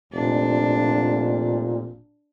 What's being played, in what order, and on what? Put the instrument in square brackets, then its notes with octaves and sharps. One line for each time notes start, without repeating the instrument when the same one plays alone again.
[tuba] F1 [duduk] A#2 [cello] D4